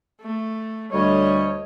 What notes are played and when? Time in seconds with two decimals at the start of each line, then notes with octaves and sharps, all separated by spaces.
0.21 A3
0.92 D2 G3 C#5 D#5